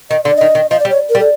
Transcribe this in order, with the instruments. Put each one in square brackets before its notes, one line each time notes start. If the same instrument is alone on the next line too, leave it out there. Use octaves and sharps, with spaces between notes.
[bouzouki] D#3 [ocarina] D#5
[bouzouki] D3 [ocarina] D5
[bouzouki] D#3 [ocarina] D#5
[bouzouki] D#3
[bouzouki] F3 [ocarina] D#5
[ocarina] D5
[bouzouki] G3
[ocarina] C#5
A#4
[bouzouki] G3
[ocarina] A4